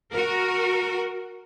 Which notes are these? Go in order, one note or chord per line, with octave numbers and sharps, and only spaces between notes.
F#4 A#4